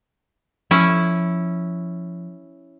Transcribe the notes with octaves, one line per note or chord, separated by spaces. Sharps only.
F3 C#4 E4